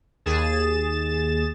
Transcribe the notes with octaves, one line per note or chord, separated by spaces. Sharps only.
D#2 G#4 A6 E7